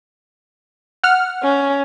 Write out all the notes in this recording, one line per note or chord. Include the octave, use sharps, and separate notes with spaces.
F#5 F6
C#4